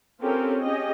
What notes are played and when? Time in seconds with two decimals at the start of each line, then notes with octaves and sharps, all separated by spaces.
0.22 C4 C#4 F4 G4 A4 A#4
0.62 C#4 G4 G#4 D#5